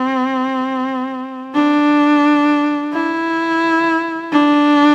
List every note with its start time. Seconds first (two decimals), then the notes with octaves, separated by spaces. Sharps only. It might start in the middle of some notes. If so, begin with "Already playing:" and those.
Already playing: C4
1.55 D4
2.94 E4
4.32 D4